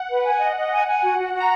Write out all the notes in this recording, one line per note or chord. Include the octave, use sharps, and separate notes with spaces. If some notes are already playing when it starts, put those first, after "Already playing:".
Already playing: F#5
B4
G#5
D#5
D#5
G#5
G#5
F#4
F#4
F#4
A#5